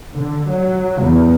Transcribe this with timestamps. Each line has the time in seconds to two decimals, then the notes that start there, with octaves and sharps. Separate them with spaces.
0.17 D3
0.50 F#3
1.02 E2